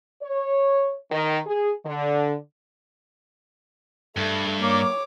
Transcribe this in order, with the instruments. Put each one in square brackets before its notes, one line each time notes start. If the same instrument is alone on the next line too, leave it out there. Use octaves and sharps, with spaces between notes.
[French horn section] C#5
D#3
G#4
D3
[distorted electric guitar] G2 [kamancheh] A3
[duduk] A#3 [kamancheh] C#5 D6